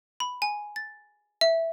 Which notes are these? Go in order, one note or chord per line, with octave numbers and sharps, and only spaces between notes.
B5
G#5
A6
E5